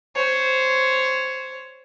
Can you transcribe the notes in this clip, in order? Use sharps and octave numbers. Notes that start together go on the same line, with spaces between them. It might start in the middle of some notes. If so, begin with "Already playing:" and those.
C5 C#5